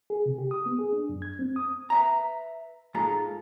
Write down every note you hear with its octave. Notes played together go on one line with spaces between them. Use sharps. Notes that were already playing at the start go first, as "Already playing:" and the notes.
G#4
C3
G4
D#6
B3
G#4
D4
F#2
G#6
C4
D#6
B4 E5 A#5
G#2 G#3 F4 A4 A#5